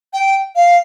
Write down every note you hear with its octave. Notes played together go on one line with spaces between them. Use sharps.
G5
F5